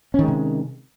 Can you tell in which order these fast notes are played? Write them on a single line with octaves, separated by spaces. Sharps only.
C#4 D#3 G#3 C3